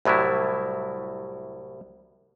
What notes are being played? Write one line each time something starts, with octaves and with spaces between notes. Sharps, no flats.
C2 A2 F#3 G3 E4